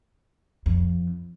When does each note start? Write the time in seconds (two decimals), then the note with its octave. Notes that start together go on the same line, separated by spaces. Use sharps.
0.66 F2